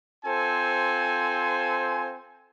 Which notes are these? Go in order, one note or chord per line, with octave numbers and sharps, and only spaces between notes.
C4 F4 A4 C5 G#5